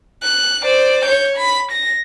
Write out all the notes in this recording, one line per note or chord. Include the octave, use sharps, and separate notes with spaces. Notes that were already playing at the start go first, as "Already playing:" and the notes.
F#6
C5 D5
C#5 G6
B5
A#6